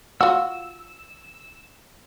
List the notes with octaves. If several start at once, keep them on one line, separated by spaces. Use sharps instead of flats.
F4 F#4 E6